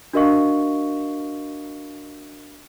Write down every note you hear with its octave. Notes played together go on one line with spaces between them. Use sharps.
D4 F#4 A#4 D#5 F5 C#6